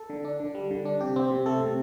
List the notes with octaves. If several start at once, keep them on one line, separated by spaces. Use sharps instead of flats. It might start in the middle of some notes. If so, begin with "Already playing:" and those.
Already playing: A4
D3
D4
D3
G3
D3
D4
C3 G4
C4
C3
A3 A4
C3